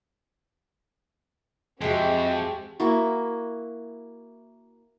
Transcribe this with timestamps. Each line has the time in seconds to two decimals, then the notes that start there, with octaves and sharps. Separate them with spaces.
1.81 F2 G#3 C4 F#4 G4 D#5 E5 G5
2.80 A#3 E4 F#4